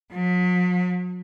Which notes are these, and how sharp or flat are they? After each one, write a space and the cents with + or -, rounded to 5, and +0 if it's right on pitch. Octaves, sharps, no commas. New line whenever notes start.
F#3 -45